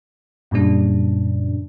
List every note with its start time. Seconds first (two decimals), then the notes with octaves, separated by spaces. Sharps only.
0.51 F#2 A#2 C#3 G3 D4